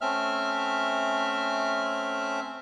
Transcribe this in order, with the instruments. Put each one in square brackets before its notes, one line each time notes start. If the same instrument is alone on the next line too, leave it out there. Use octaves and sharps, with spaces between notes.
[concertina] A3 C4 C#4 E5 F6